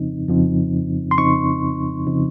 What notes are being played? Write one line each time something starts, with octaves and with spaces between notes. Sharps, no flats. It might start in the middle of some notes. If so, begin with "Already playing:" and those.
Already playing: F2 C#3 F3 C4 D#4
F2 C#3 F3 C4 D#4
C6
F2 C#3 F3 C4 D#4 C#6
C#3 F3 C4 D#4